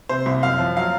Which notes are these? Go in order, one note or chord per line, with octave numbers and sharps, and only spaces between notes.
C3 C5
C2
F#2 F5
F3
F#3 F5